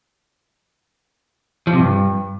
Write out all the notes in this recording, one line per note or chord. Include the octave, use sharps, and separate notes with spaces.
F3
C3
G2